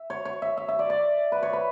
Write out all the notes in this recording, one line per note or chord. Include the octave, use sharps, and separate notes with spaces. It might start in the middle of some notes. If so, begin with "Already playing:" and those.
Already playing: E5
C#5
C#5
E5
E5
E5
D5
D5
B4
C#5
B4